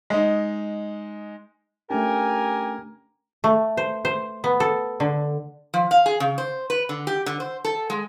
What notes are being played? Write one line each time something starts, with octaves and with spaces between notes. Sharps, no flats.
G#3 D#4
A3 C#4 D4 G4 A#4 G#5
A3
C5
C5
B3
A4
D3
F3
F5
G#4
C#3
C5
B4
D3
G4
D3
C5
A4
G#3